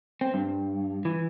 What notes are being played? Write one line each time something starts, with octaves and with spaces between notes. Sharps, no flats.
C4
G2
E3